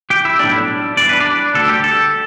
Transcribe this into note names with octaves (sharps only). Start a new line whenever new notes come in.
G4 G5
E4 E5
B1 A2 G3 D4 E4 D5
E2 E3 G3 D4 D5
B4
D4 D5
D2 D3 G3 A4
G4
A4